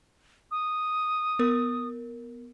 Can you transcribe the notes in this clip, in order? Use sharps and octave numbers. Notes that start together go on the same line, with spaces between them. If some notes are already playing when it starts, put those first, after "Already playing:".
D#6
B3 A#4